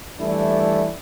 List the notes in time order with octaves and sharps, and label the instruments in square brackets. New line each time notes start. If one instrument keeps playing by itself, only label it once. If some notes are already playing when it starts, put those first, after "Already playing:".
[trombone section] E3 G3 A3 D4 E4